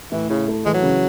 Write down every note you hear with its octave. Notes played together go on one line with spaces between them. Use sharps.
A2 E3
C#3 E4
A3
E3 G#3
F#3
C#3